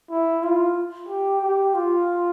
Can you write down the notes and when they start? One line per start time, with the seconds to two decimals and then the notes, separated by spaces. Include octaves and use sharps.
0.10 E4
0.43 F4
1.08 G4
1.41 G4
1.74 F4